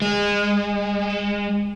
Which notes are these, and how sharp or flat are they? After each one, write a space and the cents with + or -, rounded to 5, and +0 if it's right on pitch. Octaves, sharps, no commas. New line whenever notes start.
G#3 -25